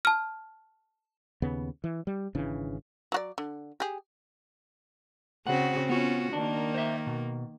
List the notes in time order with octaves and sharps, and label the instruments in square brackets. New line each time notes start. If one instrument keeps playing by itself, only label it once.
[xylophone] A5 F6
[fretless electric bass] D#2 C#3 B3
E3
G3
G#1 C#3 E3 D4
[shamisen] F#3 F#4 D5
D3
G4 G#4
[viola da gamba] C#3 C4 F#4 [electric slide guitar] F#5
[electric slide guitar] B3 [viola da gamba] C#4 F4 F#4
[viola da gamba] D#3 A#3 [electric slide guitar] D4
[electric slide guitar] C5 E5
B2